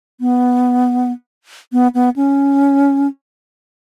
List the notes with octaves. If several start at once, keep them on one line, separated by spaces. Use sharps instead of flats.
B3
B3
B3
C#4